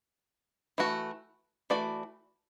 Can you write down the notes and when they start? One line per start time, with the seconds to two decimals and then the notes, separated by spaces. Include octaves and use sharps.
0.78 E3 A3 F#4
1.70 E3 A3 F#4 D5